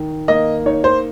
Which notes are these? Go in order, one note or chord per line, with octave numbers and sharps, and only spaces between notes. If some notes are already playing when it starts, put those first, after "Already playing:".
Already playing: D#3
A#3 D#5
D#4 C#5
C5